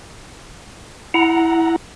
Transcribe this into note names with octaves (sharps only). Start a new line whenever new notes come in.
E4 F#5 A#5